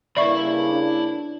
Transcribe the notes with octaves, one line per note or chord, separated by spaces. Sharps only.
G2 C#3 A#3 E4 D5 E5 B5 C#6
D4